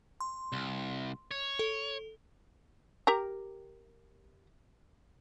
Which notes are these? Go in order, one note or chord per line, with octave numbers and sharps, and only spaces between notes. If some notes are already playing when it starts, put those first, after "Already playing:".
C6
C2
C#5
A4
G4 A#4 A#5